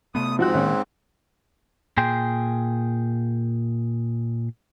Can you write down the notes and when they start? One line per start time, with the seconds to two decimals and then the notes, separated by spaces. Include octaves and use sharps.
0.15 C3 A3 B3 D#6
0.39 G#2 F3 C4 F#4 F#6
0.54 A2 D#3 A#3 C#4
1.97 A#2 G#4 G5 C6